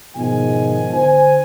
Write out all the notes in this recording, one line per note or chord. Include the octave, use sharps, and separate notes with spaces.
G#2 B2 D#3 F3 G#3 G#5
D3 C5 G#5